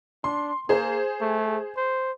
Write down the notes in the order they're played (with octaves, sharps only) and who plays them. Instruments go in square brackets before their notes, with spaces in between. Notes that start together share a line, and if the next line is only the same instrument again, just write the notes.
[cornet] D4 [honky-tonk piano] C6
[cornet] A#3 [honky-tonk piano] G#4 C5
[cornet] A3
C5